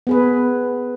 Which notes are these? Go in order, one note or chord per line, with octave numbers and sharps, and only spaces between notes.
B3 G#4 B4